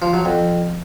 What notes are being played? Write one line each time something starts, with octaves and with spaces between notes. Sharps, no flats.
F3
F#3
F2